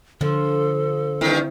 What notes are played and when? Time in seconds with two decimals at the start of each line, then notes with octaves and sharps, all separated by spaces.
0.21 D3 F3 A4
1.21 G2 D#3 C4 E4